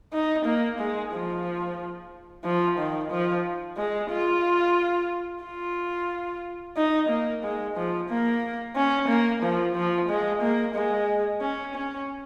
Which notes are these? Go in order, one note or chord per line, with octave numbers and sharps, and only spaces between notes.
D#4
A#3
G#3
F3
F3
D#3
F3
G#3
F4
F4
D#4
A#3
G#3
F3
A#3
C#4
A#3
F3
F3
G#3
A#3
G#3
C#4
C#4